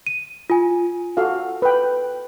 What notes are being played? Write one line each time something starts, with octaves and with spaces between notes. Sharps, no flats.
D#7
F4 G#5
F#4 A4 F5
B4 G5